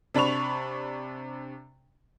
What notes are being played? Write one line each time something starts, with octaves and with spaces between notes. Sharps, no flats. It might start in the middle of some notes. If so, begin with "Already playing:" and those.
C3 D4 B5 C#6 F7